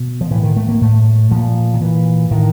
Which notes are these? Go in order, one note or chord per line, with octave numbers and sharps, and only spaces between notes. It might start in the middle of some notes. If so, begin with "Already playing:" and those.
Already playing: B2
F3
A2 E3
D#3
A3
A#3
A2 A3
A#2 F3
D#3
A#2 E3
A2 D#3